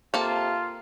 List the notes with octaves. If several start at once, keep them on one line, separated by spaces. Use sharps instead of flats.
C3 A#3 F4 A4 A5